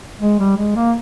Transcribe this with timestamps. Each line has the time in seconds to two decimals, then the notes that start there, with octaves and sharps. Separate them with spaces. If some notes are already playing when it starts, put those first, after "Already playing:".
0.21 G#3
0.39 G3
0.57 G#3
0.75 A#3